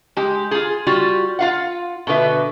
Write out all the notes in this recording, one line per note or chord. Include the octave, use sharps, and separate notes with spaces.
G#3 G4
F4 G#4
G3 F4 F#4
F4 F5 F#5
B2 D3 B4 E5